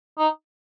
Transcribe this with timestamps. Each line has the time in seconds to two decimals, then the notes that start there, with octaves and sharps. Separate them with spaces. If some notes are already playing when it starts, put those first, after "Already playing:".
0.18 D#4